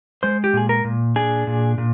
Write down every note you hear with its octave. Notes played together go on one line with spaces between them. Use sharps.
G#3 C5
G4
A#2 G#4
A#4
A#2
D4 G#4
A#2
A#2